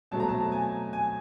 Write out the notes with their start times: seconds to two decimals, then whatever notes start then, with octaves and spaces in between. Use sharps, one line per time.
0.11 B2 F#3 A3 C4 A5
0.20 A#5
0.29 A5
0.52 G#5
0.93 G#5